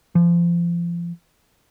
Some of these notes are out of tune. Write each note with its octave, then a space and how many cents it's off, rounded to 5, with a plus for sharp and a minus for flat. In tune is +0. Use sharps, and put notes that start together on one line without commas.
F3 -30